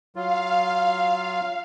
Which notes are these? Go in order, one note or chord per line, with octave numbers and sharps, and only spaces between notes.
F#3 F4 F5